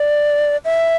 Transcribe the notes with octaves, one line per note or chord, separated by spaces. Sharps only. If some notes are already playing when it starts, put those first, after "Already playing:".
Already playing: D5
E5